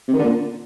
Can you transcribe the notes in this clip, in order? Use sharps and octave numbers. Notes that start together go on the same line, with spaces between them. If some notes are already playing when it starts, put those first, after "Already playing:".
C3
D#3
D3
A#2